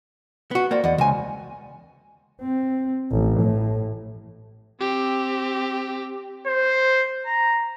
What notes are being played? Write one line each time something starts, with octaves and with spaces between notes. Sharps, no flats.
B3 F#4
A#3 C5 D5 F#5
E2 D5 D#5 F#5
C#2 C5 G#5
C4
A1
A2
C4 G4
C5
A#5